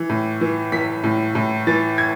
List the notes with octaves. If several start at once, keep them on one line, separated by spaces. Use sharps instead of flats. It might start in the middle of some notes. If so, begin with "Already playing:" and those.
Already playing: E3
A2
E3
E3 B6
A2
A2
E3 A6
G#6